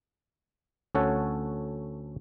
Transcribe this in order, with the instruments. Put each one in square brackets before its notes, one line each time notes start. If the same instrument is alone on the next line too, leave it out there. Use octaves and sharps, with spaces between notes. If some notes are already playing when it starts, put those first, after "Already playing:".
[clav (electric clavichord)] D2 C#4 A4 C#5 F#5